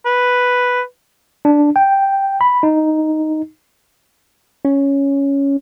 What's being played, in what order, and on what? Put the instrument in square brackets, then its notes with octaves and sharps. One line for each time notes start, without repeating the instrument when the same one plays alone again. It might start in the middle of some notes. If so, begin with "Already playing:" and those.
[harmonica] B4
[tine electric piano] D4
G5
B5
D#4
[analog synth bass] C#4